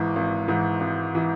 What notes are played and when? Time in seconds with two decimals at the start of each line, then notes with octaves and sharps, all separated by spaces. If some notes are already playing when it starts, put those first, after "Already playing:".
Already playing: G#1 G#2 E3
0.16 G#1
0.48 G#2 E3
0.80 G#1
1.15 E3